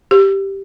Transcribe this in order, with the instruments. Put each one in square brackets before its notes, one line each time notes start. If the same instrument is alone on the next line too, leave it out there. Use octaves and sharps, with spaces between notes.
[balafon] G4